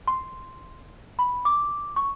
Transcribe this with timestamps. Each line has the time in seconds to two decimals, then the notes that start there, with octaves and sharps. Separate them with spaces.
0.07 C6
1.19 B5
1.45 D6
1.96 C#6